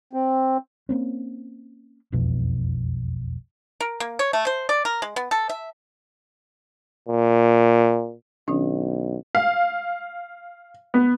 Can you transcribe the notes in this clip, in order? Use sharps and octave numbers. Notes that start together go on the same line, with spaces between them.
C4
A#3 C4 C#4
E1 B1 F2 B2
A#4
A#3
C#5
A3
C5
D5
A#4
G#3
B3
A4
E5
A#2
B1 D#3 C#4 D4
F5
B3